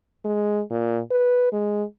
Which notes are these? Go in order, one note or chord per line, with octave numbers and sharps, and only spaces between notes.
G#3
A#2
B4
G#3